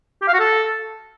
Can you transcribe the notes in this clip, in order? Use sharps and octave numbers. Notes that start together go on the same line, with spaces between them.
G4
F5
F#4
A4